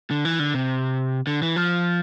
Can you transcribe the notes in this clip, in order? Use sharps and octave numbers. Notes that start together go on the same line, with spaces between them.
D3
E3
D3
C3
D3
E3
F3